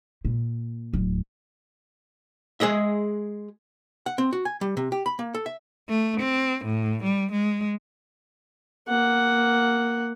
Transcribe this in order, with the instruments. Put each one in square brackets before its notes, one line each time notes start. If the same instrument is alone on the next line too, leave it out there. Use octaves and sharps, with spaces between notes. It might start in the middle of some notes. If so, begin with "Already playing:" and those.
[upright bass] A#2
D1
[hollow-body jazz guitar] G#3 G#4 D#5 E5
F#5
C4
F#4
G#5
G3
C3
G4
B5
A#3
A4
E5
[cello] A3
C4
A2
G3
G#3
[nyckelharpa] A#3 F#5